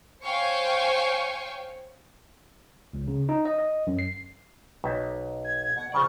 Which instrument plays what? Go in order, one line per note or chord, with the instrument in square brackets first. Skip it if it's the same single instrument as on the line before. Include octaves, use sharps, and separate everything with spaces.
[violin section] C5 C#5 F5 G5 G#5 C#6
[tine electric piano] C#2
C#3
D#4
D#5
D#5
F#2
C7
[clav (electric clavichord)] B1 E5
[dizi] G#6
[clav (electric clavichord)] B2 [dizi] F#5
[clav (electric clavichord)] A#1 C#3 D5 [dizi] C#6